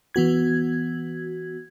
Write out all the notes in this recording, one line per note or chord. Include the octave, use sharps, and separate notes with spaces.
E3 B3 F#4 G#6